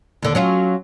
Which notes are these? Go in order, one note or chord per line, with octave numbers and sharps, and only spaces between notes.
D#2 D3
F#3 C#4 F4